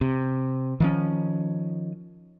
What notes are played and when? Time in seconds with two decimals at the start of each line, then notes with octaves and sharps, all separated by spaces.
0.01 C3
0.80 D#3 F3 C#4